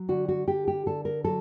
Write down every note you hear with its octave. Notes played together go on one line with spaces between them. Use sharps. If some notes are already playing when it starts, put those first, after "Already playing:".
Already playing: F#3
D3 F#4
F#4
D3 G4
G4
D3 A4
A#4
F#3 A4